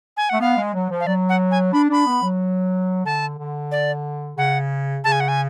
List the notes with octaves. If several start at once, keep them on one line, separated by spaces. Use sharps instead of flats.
G#5
A3 F#5
B3 F5
G#3
F#3
F3
F5
F#3 D5
F#5
G#5
D4 B5
D4 B5
B3
F#3
D3 A5
D3
D5
C#3 F#5
C#3 A5
G#5
F#5
G#5